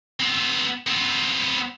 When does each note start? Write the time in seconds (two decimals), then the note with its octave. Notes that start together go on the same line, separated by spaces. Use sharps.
0.20 B3 C4
0.87 B3 C4